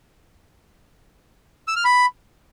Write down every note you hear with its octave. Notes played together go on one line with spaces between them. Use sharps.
E6
F6
B5